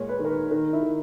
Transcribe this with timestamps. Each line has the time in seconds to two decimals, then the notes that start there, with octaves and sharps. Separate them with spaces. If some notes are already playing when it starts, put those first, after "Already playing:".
Already playing: A#2 G#3 C#5
0.09 B4
0.19 D#3
0.24 A#4
0.30 B4
0.51 D#3 A#4
0.73 E4
0.83 D#3